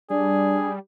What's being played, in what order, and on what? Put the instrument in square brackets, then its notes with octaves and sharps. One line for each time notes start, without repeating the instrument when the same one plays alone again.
[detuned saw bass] G3 [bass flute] D4 [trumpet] G#4 [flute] D5